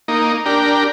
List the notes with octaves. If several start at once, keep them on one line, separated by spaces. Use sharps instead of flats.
A#3 D#4
D4 G4 A#4